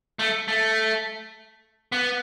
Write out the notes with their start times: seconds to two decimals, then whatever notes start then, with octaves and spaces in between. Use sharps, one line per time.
0.19 A3
0.48 A3
1.92 B3